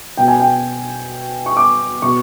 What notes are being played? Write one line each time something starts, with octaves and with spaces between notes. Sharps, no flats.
B2 G5
G#5
G5
C#6
D6
B2 C#6